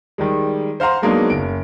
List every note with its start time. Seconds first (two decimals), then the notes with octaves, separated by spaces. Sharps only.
0.18 D#3 G3 G#3
0.80 C5 F5 F#5 A#5 C6
1.02 F#3 G#3 A#3 B3 D4 D#4
1.30 F#1 D7